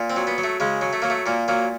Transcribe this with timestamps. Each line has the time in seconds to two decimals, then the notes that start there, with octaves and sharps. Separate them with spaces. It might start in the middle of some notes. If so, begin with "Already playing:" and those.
Already playing: A#2
0.10 C4
0.16 F#3
0.27 B3
0.38 F#3
0.44 A3
0.60 C#3 G#3
0.81 F#3
0.93 A3
1.02 F#3 A#3
1.10 A3
1.26 A#2 A#3
1.48 F#3 A#3